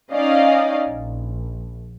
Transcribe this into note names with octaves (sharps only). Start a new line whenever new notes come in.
C#4 D#4 D5 D#5 F5
A#1